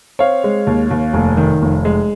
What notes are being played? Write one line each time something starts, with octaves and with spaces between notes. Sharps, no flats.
C4 C#5 F5
G#3
D#2
D#2
F1
D#3
F1
G#3